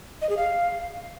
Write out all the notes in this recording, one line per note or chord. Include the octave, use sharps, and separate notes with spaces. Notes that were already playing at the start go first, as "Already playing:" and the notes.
D#5
G#4
F5